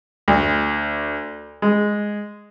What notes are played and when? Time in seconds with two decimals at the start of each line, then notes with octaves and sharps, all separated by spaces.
0.28 D2
1.62 G#3